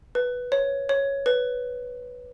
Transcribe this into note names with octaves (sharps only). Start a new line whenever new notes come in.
B4
C#5
C#5
B4